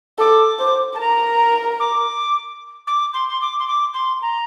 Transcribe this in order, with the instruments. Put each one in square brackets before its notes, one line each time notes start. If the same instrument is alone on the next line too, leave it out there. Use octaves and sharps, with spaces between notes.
[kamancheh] A4 [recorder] D6
[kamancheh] C5
[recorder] A5
[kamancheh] A#4 [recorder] A#5
[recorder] D6
D6
C6
C6
D6
C6
D6
C6
A#5